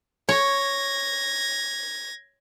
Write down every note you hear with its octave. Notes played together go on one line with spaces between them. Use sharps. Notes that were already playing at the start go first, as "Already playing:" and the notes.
C#5 G#6 A#6